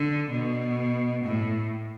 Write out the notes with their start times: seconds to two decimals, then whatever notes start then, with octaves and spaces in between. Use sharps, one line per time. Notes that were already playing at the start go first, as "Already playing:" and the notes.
Already playing: D3
0.31 B2
1.24 A2